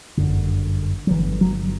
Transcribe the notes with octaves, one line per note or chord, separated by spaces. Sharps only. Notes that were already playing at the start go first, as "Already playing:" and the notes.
G1 F#2 D3
F#3
G1 G2 D3 E3
F#3